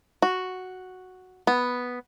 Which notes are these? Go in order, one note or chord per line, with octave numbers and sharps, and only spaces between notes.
F#4
B3